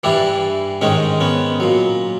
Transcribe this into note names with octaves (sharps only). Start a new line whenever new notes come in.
G2 E3 G3 D4 E4
G#2 D#3 G#3 C#4 D#4
B3 C#4
A#2 F#3